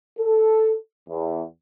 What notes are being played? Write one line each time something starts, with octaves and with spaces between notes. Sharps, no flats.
A4
E2